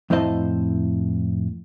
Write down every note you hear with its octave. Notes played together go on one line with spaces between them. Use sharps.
F2 A2 E4 C5 D#5 A5